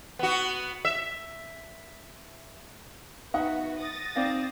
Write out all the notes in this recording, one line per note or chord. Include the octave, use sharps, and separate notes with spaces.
B3 F#4
E5
B3 D#4 F#4 E5 F#5
D#6 A6 A#6
C4 D#4 D5 F5